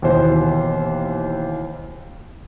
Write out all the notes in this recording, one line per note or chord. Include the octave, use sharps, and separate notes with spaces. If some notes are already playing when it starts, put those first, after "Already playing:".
D#2 B2 E3 C5